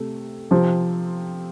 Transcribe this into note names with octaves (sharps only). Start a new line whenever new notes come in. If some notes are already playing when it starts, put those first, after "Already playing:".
Already playing: C3 A3
C3 F3 C4